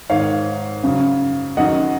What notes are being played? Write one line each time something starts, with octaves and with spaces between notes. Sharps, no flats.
G#2 D#3 C#5 F5
F#2 C#3
F#2 D#3 D#5 F#5